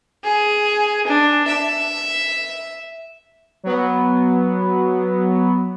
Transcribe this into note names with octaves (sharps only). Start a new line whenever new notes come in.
G#4
D4
E5
F#3 B3